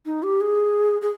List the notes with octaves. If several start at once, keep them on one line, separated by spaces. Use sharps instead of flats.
D#4
G4
G#4
G#4